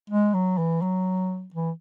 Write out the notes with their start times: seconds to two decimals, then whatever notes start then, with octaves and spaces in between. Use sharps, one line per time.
0.10 G#3
0.34 F#3
0.58 E3
0.82 F#3
1.54 E3